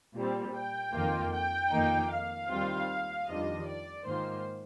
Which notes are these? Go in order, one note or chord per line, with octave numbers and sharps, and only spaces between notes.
A#2 G3 C4
G5
F2 D#3 A#3 F4
G5
F2 D#3 A#3 D#4
F5
D#2 D#3 G3 C4 F4
F2 D#3 G3 D4 F4 D#5
D5
G#2 D#3 A#3 F4 C5